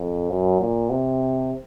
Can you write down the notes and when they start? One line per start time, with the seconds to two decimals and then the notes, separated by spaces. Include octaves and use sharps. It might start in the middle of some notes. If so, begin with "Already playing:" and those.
Already playing: F2
0.30 F#2
0.61 A#2
0.90 C3